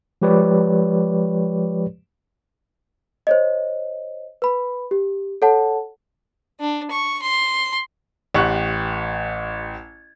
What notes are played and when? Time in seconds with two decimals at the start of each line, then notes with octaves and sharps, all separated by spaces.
0.22 F3 G#3 G4 B4 C#5 D5
3.27 C5 C#5 D#5
4.42 B4 B5
4.91 G4
5.42 A4 C#5 F#5 A5
6.60 D4
6.90 C#6
7.22 C6
8.34 A1 G4 F#5 C#6 F#6